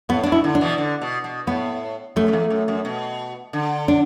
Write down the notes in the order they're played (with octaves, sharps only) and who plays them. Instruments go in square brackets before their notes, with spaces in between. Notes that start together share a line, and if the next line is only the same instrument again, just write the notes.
[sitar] A2 [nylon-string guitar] B3
[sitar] B2 [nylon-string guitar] D4
[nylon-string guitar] E4
[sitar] D3
[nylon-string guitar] D4
[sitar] B2 E3
D3
B2
B2
[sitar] A2 [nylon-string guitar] B3
[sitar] F#2 [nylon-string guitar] A3
[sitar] F#2
E2
F#2
F#2
B2
D3
[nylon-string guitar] D4